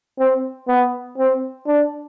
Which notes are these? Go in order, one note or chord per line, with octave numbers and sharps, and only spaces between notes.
C4
B3
C4
D4